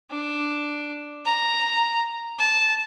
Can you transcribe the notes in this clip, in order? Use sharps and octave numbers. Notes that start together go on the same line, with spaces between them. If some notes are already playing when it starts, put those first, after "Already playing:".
D4
A#5
A5